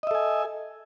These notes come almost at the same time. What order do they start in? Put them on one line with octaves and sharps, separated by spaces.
D#5 E5 A4 G#5